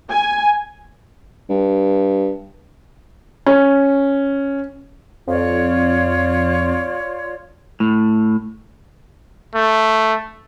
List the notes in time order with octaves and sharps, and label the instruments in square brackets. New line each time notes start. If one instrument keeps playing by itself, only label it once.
[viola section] G#5
[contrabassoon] G2
[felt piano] C#4
[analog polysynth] F2 [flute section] F4 C#5 D5
[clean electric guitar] A2
[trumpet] A3